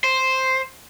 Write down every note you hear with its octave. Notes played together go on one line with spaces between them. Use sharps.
C5